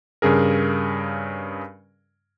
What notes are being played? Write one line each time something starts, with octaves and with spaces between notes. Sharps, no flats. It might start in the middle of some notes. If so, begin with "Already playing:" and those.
G2 C#3 G#4 A#4